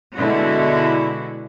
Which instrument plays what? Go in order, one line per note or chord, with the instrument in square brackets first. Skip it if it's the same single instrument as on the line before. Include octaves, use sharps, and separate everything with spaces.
[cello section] B2 D3 G#3 E4 F#4